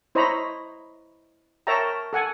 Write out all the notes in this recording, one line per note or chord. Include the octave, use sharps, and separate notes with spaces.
E4 C5 C#5 D#5 A#5 B5
A#4 C#5 E5 G5 A5 A#5
A4 F#5 G#5